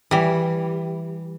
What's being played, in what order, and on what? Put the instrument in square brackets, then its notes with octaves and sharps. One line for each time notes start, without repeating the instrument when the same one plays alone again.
[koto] E3 G3